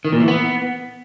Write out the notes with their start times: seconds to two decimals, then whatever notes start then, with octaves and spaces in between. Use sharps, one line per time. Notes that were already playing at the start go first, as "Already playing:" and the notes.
0.05 D#3
0.12 A#2
0.20 E3
0.28 B3